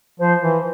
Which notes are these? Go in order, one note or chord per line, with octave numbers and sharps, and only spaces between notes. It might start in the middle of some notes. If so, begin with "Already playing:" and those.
F3 C5
E3